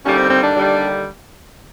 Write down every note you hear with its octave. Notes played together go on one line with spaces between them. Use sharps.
D#2 D3 G3 C#4
C4
C4
D4
D#2 D3 G3